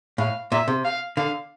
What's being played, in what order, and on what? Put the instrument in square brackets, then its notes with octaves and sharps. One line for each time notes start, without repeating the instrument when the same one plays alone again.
[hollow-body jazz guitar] A2 [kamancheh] F5
[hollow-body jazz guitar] A#2 [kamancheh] E5
[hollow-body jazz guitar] C3
[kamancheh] F5
[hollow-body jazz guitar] D3 [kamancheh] F5